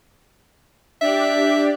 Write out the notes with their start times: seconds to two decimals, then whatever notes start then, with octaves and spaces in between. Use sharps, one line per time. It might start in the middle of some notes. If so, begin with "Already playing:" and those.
1.01 D4 G4 D5 E5